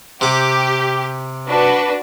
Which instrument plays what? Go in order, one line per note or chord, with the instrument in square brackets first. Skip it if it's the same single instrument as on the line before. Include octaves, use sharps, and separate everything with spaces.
[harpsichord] C3 D6 [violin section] G4
[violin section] D4 F#4 B4